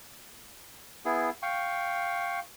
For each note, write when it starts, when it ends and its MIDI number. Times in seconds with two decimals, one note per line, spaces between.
1.05 1.30 59
1.05 1.30 64
1.05 1.30 68
1.42 2.40 77
1.42 2.40 79
1.42 2.40 85